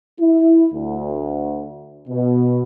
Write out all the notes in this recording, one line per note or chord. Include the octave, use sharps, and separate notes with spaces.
E4
D2
B2